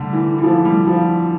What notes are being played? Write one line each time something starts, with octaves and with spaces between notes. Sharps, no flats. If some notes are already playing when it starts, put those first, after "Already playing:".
Already playing: D3 G3 A3
E3
E3
F3
G3
F3